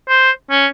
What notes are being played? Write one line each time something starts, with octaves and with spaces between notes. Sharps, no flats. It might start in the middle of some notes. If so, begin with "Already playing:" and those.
C5
C#4